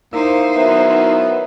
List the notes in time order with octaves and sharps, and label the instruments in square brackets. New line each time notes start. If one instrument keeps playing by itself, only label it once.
[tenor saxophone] A#3 [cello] D#4 C5 [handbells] E4 E6
[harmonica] D#3 F#3 E4 [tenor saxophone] B3 [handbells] E5